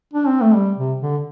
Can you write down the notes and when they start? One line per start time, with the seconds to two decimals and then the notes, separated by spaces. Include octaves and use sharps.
0.14 D4
0.27 C4
0.41 A3
0.55 G3
0.77 C3
1.01 D3